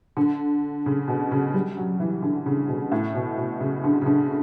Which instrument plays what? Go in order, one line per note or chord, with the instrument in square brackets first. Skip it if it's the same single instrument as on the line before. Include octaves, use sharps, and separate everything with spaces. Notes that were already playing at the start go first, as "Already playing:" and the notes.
[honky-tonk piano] D3
C#3
B2
C#3
G3
F#3
E3
D3
C#3
B2
A2
B2
B2
C#3
D3
C#3
D3